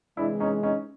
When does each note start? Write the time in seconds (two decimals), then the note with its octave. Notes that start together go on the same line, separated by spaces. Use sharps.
0.17 C3 E3 G#3 D4 E4
0.40 C#4 D#4
0.63 C#4 D#4